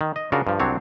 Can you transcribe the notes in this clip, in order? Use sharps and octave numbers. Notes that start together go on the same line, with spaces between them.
D#3
D#5
C#3 D4 F4 F#4 A#4
G2 F3
C2 F#3 C4 D4 C#5